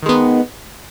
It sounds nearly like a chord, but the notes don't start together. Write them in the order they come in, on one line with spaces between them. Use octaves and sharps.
D#3 G#3 B3